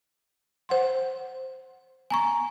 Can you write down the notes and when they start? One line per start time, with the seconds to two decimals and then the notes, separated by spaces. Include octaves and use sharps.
0.69 C5 F#5 C6
2.10 G#5 A#5 C#6